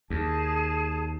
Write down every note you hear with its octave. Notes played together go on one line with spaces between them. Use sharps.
D#2 G#4 A5